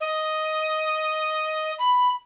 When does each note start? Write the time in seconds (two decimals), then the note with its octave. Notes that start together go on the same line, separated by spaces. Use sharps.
0.01 D#5
1.79 B5